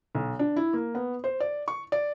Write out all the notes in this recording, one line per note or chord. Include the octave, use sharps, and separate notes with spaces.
B1
D4
E4
A#3
B3
C5
D5
C#6
D5